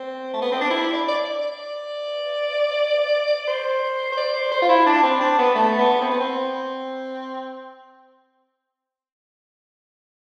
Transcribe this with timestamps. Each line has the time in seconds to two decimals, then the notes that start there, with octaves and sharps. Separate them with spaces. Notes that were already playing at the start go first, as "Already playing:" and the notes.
Already playing: C4
0.34 A3
0.42 B3
0.52 C4
0.61 D4
0.70 E4
0.93 D5
1.08 D5
1.40 D5
3.47 C5
4.12 C5
4.17 D5
4.34 C5
4.52 C5
4.62 F4
4.69 E4
4.86 D4
5.03 C4
5.21 D4
5.38 B3
5.55 A3
5.79 B3
6.02 C4
6.11 B3
6.20 C4